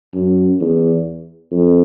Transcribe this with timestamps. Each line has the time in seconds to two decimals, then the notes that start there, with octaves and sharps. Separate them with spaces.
0.14 F#2
0.60 E2
1.51 F2